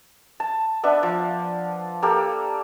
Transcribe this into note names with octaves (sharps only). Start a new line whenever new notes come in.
A5
B3 D4 E5
F3
A#3 G4 A4